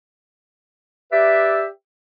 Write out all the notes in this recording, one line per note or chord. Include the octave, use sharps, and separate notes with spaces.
G4 B4 D5 E5